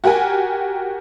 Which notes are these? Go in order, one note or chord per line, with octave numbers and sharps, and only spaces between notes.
F#4 G4 A#4 G5 G#5